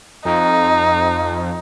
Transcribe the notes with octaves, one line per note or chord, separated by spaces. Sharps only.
F2 D#4